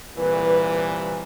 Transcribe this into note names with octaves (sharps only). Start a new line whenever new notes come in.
C2 A#2 E3 B4